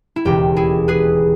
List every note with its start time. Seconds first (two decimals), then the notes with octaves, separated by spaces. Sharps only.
0.16 E4
0.25 E1 D#2 C#3 E3 G4
0.56 E4 G#4
0.88 G#4 B4